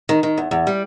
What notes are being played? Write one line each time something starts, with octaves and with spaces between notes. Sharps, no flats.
D#3
D#3
E2
E2
G3